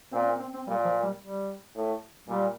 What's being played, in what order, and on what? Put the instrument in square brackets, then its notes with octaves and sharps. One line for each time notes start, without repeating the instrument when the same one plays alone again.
[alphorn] A#2 [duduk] C4
[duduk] C4
C4
C4
[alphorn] A#2 [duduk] G3
[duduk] F3
G3
G3
[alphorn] A2
[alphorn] A#2 [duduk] G3